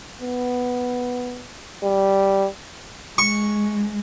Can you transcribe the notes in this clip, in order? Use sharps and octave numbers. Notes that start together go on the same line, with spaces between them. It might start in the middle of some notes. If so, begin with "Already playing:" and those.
B3
G3
G#3 C#6